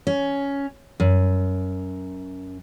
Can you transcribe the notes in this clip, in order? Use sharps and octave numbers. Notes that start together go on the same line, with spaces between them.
C#4
F#2